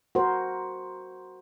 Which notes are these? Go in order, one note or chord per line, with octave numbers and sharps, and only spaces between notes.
F#4 A#4 C5